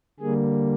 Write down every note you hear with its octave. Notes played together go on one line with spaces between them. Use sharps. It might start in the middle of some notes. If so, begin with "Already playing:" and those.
D3 G3 A#3 G#4